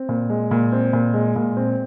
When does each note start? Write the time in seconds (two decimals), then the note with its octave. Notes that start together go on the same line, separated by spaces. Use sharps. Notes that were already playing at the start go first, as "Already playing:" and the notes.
Already playing: C4
0.09 A#2
0.30 G#3
0.51 A#2
0.72 C4
0.93 A#2
1.14 G#3
1.36 A#2
1.57 C4